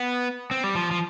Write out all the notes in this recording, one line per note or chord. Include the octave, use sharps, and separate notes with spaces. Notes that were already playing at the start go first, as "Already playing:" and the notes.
Already playing: B3
C4
G3
F3
F3